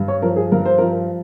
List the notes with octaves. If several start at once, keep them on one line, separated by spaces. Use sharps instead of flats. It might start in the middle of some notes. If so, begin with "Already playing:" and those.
Already playing: G2
C#5
F3 A#4
G#4
G2 A#4
C5
F3 A#4